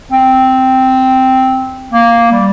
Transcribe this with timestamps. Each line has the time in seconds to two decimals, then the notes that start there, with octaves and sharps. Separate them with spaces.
0.12 C4
1.92 A#3
2.32 G3